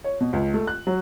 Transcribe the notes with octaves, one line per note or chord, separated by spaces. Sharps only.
C#5
B2
C#2
A3
F#6
F#3